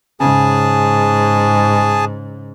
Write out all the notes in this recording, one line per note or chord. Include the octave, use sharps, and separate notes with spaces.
G#2 C#3 G#4 G#5 A5